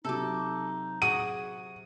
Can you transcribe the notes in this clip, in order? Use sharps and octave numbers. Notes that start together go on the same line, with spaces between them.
C3 F#3 D#4 A4 D6
F#4 G#4 D#6 D#7